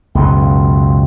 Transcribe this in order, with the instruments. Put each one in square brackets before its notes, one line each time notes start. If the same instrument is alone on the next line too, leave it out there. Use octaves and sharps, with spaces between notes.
[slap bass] C#2 F#2 B2 [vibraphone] G5 C6